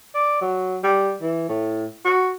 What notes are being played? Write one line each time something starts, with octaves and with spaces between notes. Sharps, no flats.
D5
F#3
G3
E3
A2
F#4